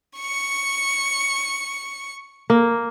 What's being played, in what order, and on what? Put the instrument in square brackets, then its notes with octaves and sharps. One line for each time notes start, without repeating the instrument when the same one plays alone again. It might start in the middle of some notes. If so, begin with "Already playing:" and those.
[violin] C#6 C#7
[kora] A#3